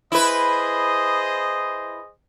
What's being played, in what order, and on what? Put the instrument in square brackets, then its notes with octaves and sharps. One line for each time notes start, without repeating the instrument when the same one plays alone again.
[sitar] E4 B4 [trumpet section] G#4 C5 D#5